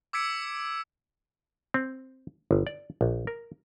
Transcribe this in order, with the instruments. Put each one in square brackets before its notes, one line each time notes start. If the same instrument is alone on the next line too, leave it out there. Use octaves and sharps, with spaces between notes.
[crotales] D6 E6 G#6 B6 C#7 D7
[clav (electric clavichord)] C4
G1
D5
A#1
A#4